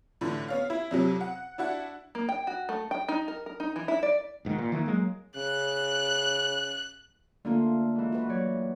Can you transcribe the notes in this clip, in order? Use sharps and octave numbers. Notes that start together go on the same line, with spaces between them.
A2 D3 E3
B3 C#5 F5
E4
F2 C3 F#3
F#5
D4 E4 F#4 F#5
A#3
G5
F#4
A3
G5
D#4
A#4
A#4
D#4
E3
E4
D5
F1 G#2 D#3
A#2
D#3 E3 G3 A#3
F#3 G#3 A#3
C#3 F#6
D3 A3 A#3 D4 F4
G#2 E3
F#4 B4
F#3 C#5 D5